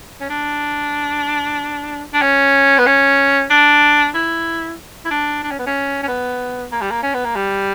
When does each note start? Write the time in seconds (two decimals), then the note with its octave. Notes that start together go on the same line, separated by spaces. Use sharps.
0.20 C#4
0.29 D4
2.13 D4
2.22 C#4
2.78 B3
2.86 C#4
3.50 D4
4.14 E4
5.05 E4
5.11 D4
5.43 D4
5.51 C#4
5.59 B3
5.66 C#4
6.03 C#4
6.08 B3
6.72 A#3
6.81 G3
6.91 A#3
7.03 C#4
7.14 B3
7.25 A#3
7.36 G3